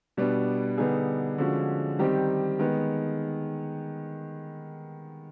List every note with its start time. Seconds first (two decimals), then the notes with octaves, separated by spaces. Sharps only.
0.17 B2 G3 B3 D4
0.78 D3 G3 B3 D#4 G#4
1.38 D3 F3 G#3 C#4 F#4
1.99 D#3 G3 C4 D#4 G4
2.59 D#3 G#3 B3